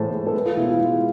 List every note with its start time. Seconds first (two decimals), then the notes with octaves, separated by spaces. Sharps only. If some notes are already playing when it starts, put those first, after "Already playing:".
Already playing: A2 E3 G#3 C5 A5
0.10 A2
0.27 A4
0.34 G#3 B4
0.46 F4
0.57 B2 E4
0.67 F4
0.79 G#3 E4